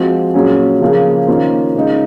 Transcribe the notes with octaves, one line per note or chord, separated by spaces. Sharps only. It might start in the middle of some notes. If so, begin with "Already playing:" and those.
Already playing: F3 G#3 C4 F#4
A#2 F#3 C#4 G#4
C#3 F3 A#3 C#4 G#4
D#3 A#3 C#4 F4 C5
C#3 G#3 D#4